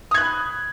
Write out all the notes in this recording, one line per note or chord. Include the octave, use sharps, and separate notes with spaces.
B5 D#6 F#6 G#6